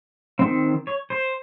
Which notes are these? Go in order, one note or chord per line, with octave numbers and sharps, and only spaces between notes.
D#3 G#3 C4
C#5
C5